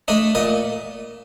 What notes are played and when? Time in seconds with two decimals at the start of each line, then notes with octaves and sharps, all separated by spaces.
0.08 A3 D4 D#5
0.35 A#2 D#5